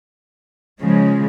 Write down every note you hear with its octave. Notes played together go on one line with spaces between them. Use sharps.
C#3 F3 G#3